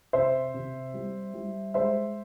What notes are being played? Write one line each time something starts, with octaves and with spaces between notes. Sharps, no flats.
C3 C5 E5
C3
G3
G3
G#3 C5 E5